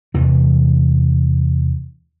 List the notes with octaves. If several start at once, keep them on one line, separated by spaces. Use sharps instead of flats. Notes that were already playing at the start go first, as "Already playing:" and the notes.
E2 C3 E3